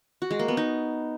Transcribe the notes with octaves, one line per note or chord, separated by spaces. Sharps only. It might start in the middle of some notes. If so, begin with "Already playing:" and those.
F#4
G#3
A#3
B3
D#4